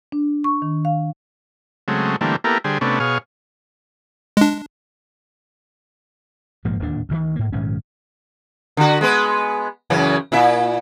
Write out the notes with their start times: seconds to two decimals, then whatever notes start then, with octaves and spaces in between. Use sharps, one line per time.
0.12 D4
0.44 C#6
0.62 D#3
0.85 F5
1.88 C#3 F#3 G#3 A3 C4
2.21 D3 E3 G3 A3 A#3 C4
2.44 A#3 B3 E4 G4 A4 A#4
2.64 D3 G3 G#4 C5
2.81 C3 A3 B3 C#4 D4
3.00 B2 G#4 C#5 F5
4.37 G#3 D4
6.65 A#1 G#2 F3 A#3
6.79 D1 D#2 A#2 D4
7.09 D2 C3 D#3
7.36 G#2 A#3
7.52 A#1 G#2 D#3 C#4
8.77 D3 F#4
9.01 G#3 B3 B4
9.90 F#2 C#3 E3
10.32 A#2 E4 E5